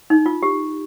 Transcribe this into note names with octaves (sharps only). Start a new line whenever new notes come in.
D#4
F4
G4